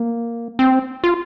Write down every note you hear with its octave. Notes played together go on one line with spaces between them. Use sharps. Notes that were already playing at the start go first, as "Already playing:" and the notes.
Already playing: A#3
C4
F4